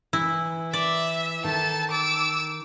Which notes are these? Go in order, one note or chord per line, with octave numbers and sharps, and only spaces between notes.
E3 E4
D5 E5
D#3 A4 A5
D6 E6